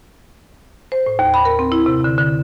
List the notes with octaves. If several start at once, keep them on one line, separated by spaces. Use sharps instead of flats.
C5
A2
D#2
B5
A#4
C4
E4
C3
D3
D3